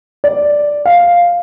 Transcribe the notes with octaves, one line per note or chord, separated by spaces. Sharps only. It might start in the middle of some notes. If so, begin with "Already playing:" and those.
D5
F5